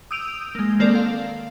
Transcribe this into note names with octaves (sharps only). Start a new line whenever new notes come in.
D#6 E6 G6 D7 D#7 F7
G#3 A#3
D#3 A#3 C4 A4 A#4 D5
F5